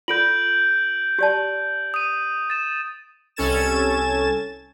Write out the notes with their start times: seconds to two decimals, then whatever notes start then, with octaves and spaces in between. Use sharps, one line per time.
0.08 F4 A4 G6 D7 F#7
1.18 G4 D5 A5
1.94 D#6 D#7
2.50 A6 E7
3.36 C2 C#4 A4 G#6 A6 E7